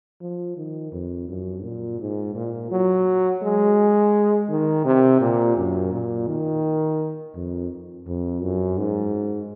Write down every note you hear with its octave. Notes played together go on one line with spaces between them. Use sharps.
F3
D#3
F2
F#2
A#2
G#2
A#2
F#3
G#3
D#3
C3
A#2
F#2
A#2
D#3
F2
F2
F#2
G#2